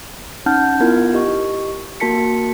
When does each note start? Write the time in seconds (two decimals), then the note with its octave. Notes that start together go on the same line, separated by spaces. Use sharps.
0.46 C#4 D#4 F#5 A5 F6 G6
0.80 B3 E4 F4 A#4 G#6
1.14 G4 D#5 C#6
2.00 A#3 F#4 A#4 A5 B6 C#7